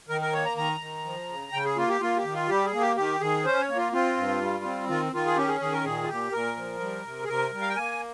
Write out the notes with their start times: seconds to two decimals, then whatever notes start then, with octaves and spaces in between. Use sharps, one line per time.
0.09 D#3 A#4
0.21 A#4
0.33 A#3 C#5
0.45 A#5
0.56 D#3 A#5
0.80 D#3
1.05 F3
1.29 C#3
1.52 C#3 G5
1.65 G#4
1.76 A#3 F4
1.89 G4
2.01 A#3 F4
2.17 G4
2.24 D#3
2.33 F4
2.49 G3 G4
2.65 G#4
2.73 A#3
2.81 G4
2.97 D#3 G4
3.20 D#3 G#4
3.45 C#4 C5
3.61 C#5
3.69 A#3
3.77 F4
3.92 C4 F4
4.17 G2
4.41 G3
4.64 C4
4.88 D#3 F4
5.12 D#3 F4
5.26 G#4
5.37 C#4 G4
5.48 G#4
5.60 D#3 G#4
5.72 A#4
5.84 A#2 G#4
6.03 F4
6.08 A#2 G4
6.32 A#2 A#4
6.57 F3
6.80 G3
7.05 C3
7.24 G#4
7.28 C3 A#4
7.52 G3
7.61 F5
7.69 G5
7.76 A#3 G#5